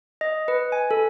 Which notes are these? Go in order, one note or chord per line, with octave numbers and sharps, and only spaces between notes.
D#5
B4
G#5
A4